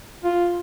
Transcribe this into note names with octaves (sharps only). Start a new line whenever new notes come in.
F4